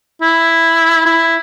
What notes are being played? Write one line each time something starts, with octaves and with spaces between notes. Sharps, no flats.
E4
E4